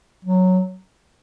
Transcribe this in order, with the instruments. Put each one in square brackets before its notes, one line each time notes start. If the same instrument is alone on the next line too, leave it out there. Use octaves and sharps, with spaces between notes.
[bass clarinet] F#3